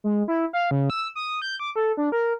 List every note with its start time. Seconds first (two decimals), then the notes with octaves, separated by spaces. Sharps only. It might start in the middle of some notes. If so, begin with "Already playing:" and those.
0.04 G#3
0.28 E4
0.53 F5
0.71 C#3
0.90 E6
1.15 D#6
1.42 G6
1.59 D6
1.76 A4
1.97 D4
2.12 A#4